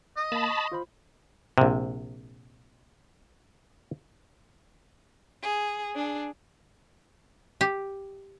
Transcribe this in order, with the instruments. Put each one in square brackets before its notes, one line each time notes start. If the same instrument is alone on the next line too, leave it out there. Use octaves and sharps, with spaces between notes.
[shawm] D#5
[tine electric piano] A#3 [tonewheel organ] A5 B5
[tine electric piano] C#6
F4 C5 B5
[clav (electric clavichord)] A#1 C3
[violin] G#4
D4 G#4
[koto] G4